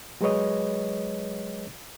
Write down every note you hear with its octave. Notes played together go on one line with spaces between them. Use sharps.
F#3 G#3 G#4 B4 C#5 D#5